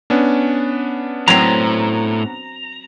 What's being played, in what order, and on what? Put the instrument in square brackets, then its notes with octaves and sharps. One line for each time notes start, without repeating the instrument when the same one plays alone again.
[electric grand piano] B3 C#4 D4
[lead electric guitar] A2 [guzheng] F#3 C4 [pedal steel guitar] A#5